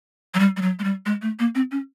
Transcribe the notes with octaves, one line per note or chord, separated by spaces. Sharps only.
F#3
G3
G3
F#3
G#3
G3
G#3
A3
A#3
C4
C#4